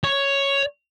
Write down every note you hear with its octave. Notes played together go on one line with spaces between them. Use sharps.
C#5